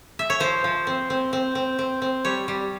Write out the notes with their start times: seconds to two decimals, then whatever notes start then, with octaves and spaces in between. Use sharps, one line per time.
0.19 E5
0.30 C#5
0.40 F3 C5
0.64 F3
0.87 C4
1.10 C4
1.33 C4
1.55 C4
1.79 C4
2.02 C4
2.25 G3 C#5
2.48 G3